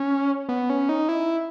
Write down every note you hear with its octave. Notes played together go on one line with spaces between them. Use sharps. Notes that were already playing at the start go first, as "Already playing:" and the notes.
Already playing: C#4
B3
C#4
D#4
E4